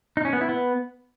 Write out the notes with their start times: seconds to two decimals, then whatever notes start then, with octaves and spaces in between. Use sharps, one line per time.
0.17 D#4
0.25 C#4
0.33 B3
0.41 E4
0.49 B3